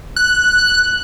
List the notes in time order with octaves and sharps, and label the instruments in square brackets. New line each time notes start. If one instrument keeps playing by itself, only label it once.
[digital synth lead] F#6